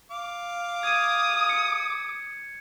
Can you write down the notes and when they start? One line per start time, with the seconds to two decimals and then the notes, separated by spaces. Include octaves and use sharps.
0.11 F5 D6
0.83 D#6 G#6 D#7
1.49 C#7